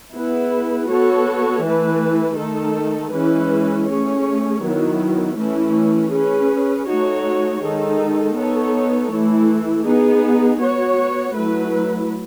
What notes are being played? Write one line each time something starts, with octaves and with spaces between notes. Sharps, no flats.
B3 E4 G#4 B4
B3 F#4 A4 C#5
E3 A3 E4 B4
D#3 A3 D#4 A4
E3 G#3 C#4 E4 B4
A3 C#4 G#4 C#5
D#3 F#3 B3 E4
E3 A3 C#4 E4
C#4 G#4 B4
A3 D#4 F#4 C#5
D#3 G#3 D#4 A4
B3 D#4 A4 C#5
E3 A3 E4
B3 D#4 G#4
B3 F#4 C#5
F#3 A3 E4 B4